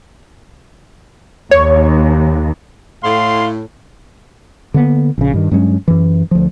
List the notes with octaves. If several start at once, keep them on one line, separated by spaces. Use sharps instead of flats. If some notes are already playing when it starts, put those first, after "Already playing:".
D#2 C#5
A2 F5 C6
D3 A#3 B3
A#1 C#3
G2 D#3
G2 F#3 G#3 C#4
F#2 E3
D2 F3